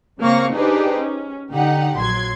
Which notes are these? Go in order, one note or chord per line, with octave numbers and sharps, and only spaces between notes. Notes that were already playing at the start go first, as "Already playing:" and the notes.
C#3 A#3 C4 F5 C#6 A#6
D4 D#4 G4 G#4 B4 C5
C#4
D3 D#4 G4 F#5
A#1 F#3 C6 G#6